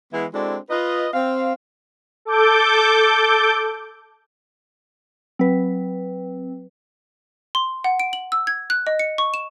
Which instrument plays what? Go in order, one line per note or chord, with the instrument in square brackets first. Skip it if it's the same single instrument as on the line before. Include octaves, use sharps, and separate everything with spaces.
[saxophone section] E3 G#3 B3 E4
G#3 C4 D4 E4 F#4 A4
F4 B4 D#5
C4 F5
[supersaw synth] A4 D6 G6
[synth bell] F#3 B4 [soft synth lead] C4
[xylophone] C6
F#5
D7
F#7
E6
G#6
F#6
D#5
C#7
C#6
E7